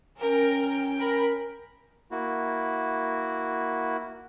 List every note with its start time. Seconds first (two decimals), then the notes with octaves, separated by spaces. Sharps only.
0.19 C#4 A#4 G5
1.00 A#4 B5
2.11 A#3 E4 F#4